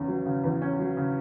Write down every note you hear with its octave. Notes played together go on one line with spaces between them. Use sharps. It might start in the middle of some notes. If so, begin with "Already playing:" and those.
Already playing: E2 C#3 C#4
F#3
C#3
E2
C#4
F#3
C#3